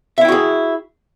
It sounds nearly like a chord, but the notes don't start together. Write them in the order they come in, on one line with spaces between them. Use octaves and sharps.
E5 E4 G5 F#4 G#4